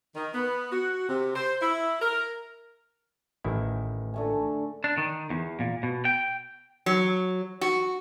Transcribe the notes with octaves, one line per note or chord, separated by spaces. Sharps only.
D#3
B3
F#4
C3
C5
E4
A#4
A1 D#3 E4
D3 A3 G#5
D4
D#3
E2
A#2
B2
G5
F#3
F#4